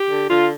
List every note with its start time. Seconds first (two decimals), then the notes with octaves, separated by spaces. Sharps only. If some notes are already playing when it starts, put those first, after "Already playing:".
Already playing: G4
0.11 D3
0.29 D3 F4